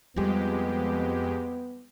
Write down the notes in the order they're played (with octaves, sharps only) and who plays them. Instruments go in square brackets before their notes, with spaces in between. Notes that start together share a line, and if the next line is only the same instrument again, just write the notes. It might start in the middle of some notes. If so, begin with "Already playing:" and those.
[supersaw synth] F2 G#3 G4 [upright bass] G3 F4 [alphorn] B3